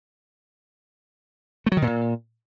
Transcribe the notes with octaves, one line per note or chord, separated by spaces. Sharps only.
A3
F#3
D#3
B2
A#2